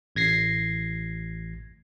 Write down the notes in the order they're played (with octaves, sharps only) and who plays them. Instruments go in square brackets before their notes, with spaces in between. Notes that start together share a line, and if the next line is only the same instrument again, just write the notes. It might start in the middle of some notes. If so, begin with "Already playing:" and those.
[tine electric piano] A1 G#6 A#6 C7